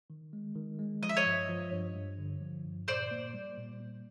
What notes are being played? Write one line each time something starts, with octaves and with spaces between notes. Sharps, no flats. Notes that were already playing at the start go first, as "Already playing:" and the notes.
D#3
G#3
D#3
G#3
F3 D#5
E5
C#5 D#5
G2
F3
G2
G2
D3
F3
G2
A#2 C5 D5
A#3
G3
A#2
A#3